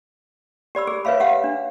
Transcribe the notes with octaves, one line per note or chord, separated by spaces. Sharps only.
G4 D5 B5 E6
G#4
B4 C#5 E5 F5 B5
G4 F5 F#5
D4